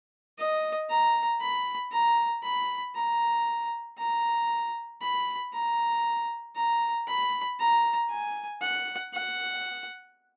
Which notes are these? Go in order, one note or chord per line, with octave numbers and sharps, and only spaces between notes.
D#5
A#5
B5
A#5
B5
A#5
A#5
B5
A#5
A#5
B5
A#5
G#5
F#5
F#5